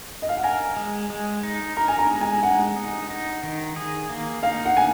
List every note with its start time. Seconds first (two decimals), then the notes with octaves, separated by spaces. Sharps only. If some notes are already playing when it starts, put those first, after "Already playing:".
0.22 D#5
0.29 F5
0.37 F#5
0.43 A#4 G#5
0.77 G#3
1.10 G#3
1.43 D#4
1.76 A#4 A#5
1.88 G#5
1.99 A#5
2.10 G#3
2.21 G#5
2.43 G#3 F#5
2.76 D#4
3.10 D#4
3.43 D#3
3.76 G#4
4.09 A#3
4.43 D#4 F5
4.65 F#5
4.76 D#3 G#5